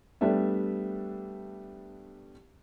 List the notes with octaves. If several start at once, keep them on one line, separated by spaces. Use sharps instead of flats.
G3 A3 B3 D4 E5